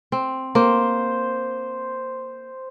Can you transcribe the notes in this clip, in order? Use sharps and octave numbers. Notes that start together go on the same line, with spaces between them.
C4
A#3 C5